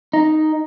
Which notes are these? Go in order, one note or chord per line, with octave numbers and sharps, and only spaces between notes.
D#4